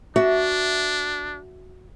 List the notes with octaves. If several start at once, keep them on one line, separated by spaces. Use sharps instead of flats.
D4 F#4 E5